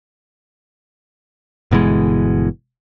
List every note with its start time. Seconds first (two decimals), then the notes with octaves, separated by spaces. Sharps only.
1.71 G1 B2 E3 G#3